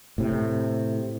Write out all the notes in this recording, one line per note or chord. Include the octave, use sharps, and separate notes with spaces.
A2 C3